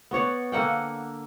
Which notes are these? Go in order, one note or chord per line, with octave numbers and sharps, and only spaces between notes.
B3 F#4 C#5 D5
D3 A#3 F#5 G5